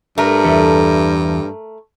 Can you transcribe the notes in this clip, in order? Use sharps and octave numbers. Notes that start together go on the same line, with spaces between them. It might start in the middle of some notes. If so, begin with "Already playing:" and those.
G2 A3 A#4
E2 A4 E5